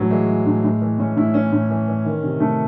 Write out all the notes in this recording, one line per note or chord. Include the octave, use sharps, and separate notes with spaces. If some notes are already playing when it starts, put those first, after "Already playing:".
Already playing: A2 E3 F#3
E3 G#3
E3
A2
A2
E3
A2 C#4
A2 E4
E3 C#4
A2
E3
E3
D#3
C3
C3 A3